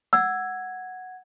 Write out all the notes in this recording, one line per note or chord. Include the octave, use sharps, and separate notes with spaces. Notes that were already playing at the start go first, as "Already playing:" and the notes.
F#5 E6 G#6